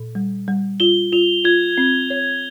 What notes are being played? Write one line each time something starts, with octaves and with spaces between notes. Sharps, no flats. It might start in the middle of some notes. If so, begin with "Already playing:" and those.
Already playing: A#2
G3
G3
F4 G7
F4 F7
F4 G#6
C4
C#5